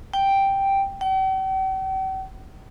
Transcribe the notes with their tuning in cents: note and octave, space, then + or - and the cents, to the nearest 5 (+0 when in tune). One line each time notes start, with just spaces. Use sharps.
G5 +0
G5 -45